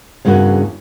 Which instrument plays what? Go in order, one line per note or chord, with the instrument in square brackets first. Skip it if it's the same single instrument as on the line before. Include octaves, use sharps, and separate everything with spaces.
[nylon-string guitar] E2 G2 C#3 A#3 F#4